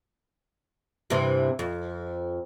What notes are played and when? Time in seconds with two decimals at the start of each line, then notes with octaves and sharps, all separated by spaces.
1.10 G2 C3 E3
1.59 F2